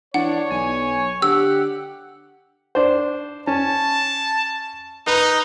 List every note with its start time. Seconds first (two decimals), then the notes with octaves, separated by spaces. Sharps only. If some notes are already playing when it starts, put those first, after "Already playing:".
0.14 E3 D4 C#5 F#5
0.51 B1 G#5
1.22 D3 G4 F#5 E6
2.75 D4 C5
3.47 C#4 A5
5.07 D#4 B4